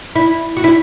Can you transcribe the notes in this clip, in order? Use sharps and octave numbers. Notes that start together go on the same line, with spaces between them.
E4
F#4
E4